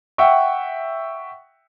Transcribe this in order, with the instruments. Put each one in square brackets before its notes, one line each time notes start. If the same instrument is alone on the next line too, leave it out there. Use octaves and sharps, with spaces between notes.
[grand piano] E5 F#5 G5 C#6